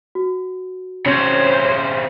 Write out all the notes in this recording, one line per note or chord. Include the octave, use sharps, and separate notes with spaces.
F#4
C#3 C4 C5 C#5